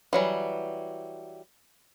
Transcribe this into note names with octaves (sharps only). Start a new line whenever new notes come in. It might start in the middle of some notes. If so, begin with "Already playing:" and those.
E3 F#3 G3